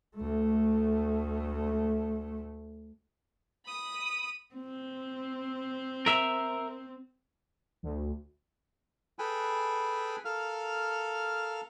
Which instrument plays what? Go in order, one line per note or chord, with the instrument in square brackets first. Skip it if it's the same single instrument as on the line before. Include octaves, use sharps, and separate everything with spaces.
[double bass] D2 A3
[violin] B5 D#6
[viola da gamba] C4
[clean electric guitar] A#4 E5
[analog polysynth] D2
[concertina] G#4 A4 B4 G5 G#5 B5
A4 A#4 F5 F6